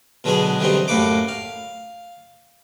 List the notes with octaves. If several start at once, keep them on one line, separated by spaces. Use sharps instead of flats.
B2 D3 F#3 G#3 B3 G#4
D3 E3 F#3 G3 C4 D#4
F#2 A2 A#3 B4 C#6 D6
F5